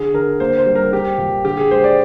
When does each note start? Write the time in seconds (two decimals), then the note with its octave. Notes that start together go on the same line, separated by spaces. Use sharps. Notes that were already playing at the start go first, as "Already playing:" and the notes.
Already playing: D3 G#4
0.14 D3 A#4
0.40 A#3 C5
0.58 C5
0.66 G3
0.75 A#4
0.92 C4 G4
1.18 A#2
1.45 D3 G4
1.57 G#4
1.71 G#3 C5
1.84 D5